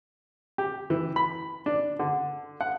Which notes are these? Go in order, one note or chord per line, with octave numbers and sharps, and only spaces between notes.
G4
E3
B5
D4
D3
F#5